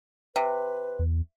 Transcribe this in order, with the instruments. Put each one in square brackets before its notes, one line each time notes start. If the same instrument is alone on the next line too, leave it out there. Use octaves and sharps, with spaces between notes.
[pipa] C3 [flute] B4
[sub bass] E2